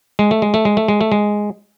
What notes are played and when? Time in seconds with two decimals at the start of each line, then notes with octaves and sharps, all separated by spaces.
0.19 G#3
0.31 A3
0.42 G#3
0.54 A3
0.65 G#3
0.77 A3
0.88 G#3
1.01 A3
1.12 G#3